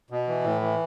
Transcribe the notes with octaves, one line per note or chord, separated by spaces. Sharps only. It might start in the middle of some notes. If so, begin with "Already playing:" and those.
B2
E3
A2
E3